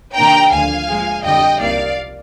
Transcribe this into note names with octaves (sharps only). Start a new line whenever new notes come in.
C3 D#3 A#3 D4 G5 A#5
D2 D3 F3 F5 G#5
A#2 F3 G#3
F2 D3 G3 D4 D#5 G5
C2 C3 F3 A#3 D#4 D5 F5